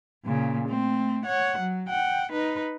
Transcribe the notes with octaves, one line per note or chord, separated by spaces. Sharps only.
A#2 C#3
A3 C4
C#5 F#5
F#3
F#5 G5
D#4 B4